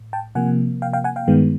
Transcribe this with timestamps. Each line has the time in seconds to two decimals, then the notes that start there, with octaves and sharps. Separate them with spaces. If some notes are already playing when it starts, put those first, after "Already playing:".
Already playing: A2
0.13 G5 A5
0.35 C3 F3 A#3 F#5 G#5
0.82 F5 G5
0.93 F5 G5
1.04 F#5 G#5
1.16 F5 G5
1.27 G2 D#3 G#3 B3